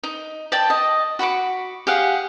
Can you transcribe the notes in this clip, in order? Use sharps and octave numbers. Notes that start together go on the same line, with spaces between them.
D#4
D5 G5 A5
D#5
F#4 B5 C#6 D6
G4 G#4 F5 F#5